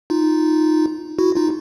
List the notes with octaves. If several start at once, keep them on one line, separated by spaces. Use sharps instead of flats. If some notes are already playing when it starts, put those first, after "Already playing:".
D#4 F4
E4 F#4
D#4 F4